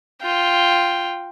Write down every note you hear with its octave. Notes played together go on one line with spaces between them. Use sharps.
F4 G5